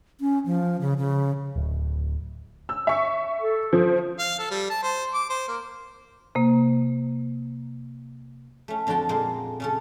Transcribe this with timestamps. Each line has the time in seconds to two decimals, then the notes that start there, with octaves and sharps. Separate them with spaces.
0.21 C#4
0.46 F3
0.81 C#3
0.98 C#3
1.56 D1
2.69 E6
2.87 E5 C#6
3.41 A4
3.73 F3 C5
4.19 F5
4.39 A4
4.51 G3
4.70 A5
4.83 C5
5.14 D6
5.29 C5
5.48 A#3
6.35 C3 A#3
8.68 A3 C#4
8.87 F2 D3 D4 F#4 G5 A5
9.09 A#2 G#3 A#3 A#4 C5 A5
9.60 C#3 C#4 A4